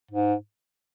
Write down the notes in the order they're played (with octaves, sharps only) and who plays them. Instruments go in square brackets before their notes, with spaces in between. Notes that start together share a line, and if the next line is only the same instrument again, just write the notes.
[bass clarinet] G#2